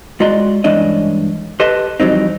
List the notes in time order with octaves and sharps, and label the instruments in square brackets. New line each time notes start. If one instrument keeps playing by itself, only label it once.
[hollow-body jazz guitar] G#3 F4 F#4 D5 A#5 C6
G2 E3 G#3 C#4 D4 D#5
G4 A4 B4 D#5 A5 C6
F2 E3 F#3 G3 C4 D#4